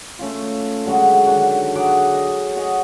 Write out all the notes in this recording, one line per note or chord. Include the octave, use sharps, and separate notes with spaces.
A3 C#4 F4
D3 F#3 G#3 F#4
D3 D#3 D4 F#4
F#3 G#4 F#5 D6
D#5
F#4 D#5 G#5